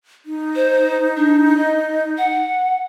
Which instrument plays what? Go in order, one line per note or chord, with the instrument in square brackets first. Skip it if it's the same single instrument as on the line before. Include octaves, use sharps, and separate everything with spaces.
[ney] D#4
[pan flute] C5
D4
D#5
F#5